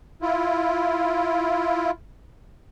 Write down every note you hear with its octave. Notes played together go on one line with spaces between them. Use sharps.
E4 F4